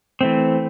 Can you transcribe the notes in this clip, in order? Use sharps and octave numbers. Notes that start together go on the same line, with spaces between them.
E3 A3 C4